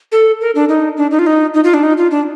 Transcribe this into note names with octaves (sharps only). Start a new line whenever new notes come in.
A4
A#4
D4
D#4
D4
D#4
F4
D#4
D#4
F4
D4
D#4
F4
D4